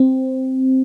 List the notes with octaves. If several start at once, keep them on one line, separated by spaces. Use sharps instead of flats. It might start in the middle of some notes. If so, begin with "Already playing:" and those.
Already playing: C4